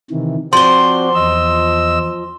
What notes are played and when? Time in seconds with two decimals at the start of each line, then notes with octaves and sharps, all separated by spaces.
0.11 C3 D#3 E3
0.53 F3 C4 F#4 C5 D5 C6 G7
1.15 E2 D#5 E6